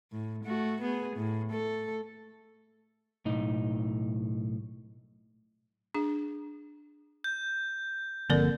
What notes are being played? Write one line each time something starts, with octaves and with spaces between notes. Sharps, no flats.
A2
A3 F#4
B3 G#4
A2
A3 A4
B1 A2 D#4
D4 G#4
G6
G1 D3 F3 A#3 C4 A#4 D5